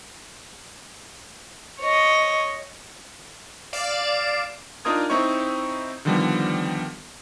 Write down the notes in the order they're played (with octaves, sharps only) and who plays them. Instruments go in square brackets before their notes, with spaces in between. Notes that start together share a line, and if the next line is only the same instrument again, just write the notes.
[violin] C#5 D#5
[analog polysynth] D5 F5 D7 E7
[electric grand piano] D4 D#4 F4 A#4 D#6 G#6
C4 D#4 E4 C#5 C#6
D3 D#3 F3 G3 B3